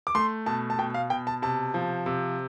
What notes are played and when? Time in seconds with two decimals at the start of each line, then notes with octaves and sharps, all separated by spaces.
0.07 D6
0.15 A3 C6
0.46 B2 A5
0.70 A5
0.78 B2 G5
0.94 F5
1.10 B2 G5
1.27 A5
1.42 C3 A5
1.74 F3
2.06 C3